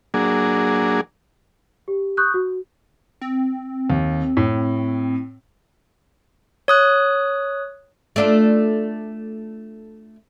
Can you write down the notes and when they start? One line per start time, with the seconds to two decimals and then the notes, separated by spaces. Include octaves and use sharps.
0.14 F#3 A#3 D4 G#4
1.88 G4
2.17 C#6 D#6 F#6 G6
2.34 F#4
3.21 C4
3.90 D#2
4.37 A2
6.68 C#5 D#6 F#6
8.16 A3 D4 F4